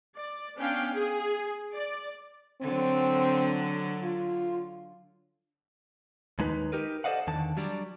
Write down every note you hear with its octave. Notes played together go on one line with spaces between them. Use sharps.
D5
B3 C#4 D4 F5 G5
G#4
D5
D3 F#3 C4
F4
D#2 G#3 D#4 B4
D#4 G4 A#4 B4
A4 C5 D5 D#5 F5 F#5
E2 D3 D#3 A5
F#3 G3 D4